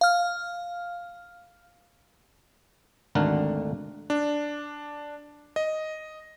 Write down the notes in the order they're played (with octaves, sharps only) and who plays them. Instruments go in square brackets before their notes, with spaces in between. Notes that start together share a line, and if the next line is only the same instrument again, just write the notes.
[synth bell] F5 F6
[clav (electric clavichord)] G#1 D2 D3 A3 A#4 F#5
[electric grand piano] D4
D#5